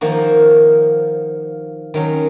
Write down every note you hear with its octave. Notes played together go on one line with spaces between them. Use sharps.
D#3 F3 A#3 F#4
D#3 F#3 C#4